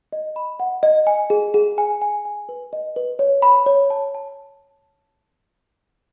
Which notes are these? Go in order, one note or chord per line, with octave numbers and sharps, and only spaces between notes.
D#5
B5
F#5
D#5
G#5
G#4
G#4
G#5
G#5
G#5
B4
D#5
B4
C#5
B5
C#5
A5
A5